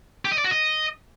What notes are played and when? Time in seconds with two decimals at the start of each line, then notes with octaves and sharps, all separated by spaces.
0.25 G4
0.31 D#5
0.38 D5
0.45 F#4
0.51 D#5